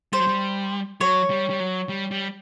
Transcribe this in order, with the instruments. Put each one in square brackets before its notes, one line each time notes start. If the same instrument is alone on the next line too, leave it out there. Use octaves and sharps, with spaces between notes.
[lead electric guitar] G3 [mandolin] C5
[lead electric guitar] F#3
G3
[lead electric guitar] F#3 [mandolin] C#5
[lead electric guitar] G3
G3
F#3
G3
G3